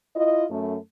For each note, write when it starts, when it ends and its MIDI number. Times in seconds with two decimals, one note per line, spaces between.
0.16 0.45 64
0.16 0.45 65
0.16 0.45 75
0.50 0.76 42
0.50 0.76 57